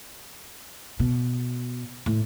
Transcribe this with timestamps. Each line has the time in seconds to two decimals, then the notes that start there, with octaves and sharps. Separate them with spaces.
0.99 B2
2.06 A2